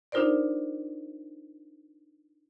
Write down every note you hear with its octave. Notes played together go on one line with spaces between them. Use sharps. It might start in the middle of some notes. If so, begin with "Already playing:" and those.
D4 D#4 F4 A#4 C5 D5